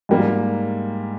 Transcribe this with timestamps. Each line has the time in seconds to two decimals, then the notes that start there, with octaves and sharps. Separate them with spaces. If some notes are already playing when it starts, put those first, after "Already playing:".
0.09 G#2 G3 A#3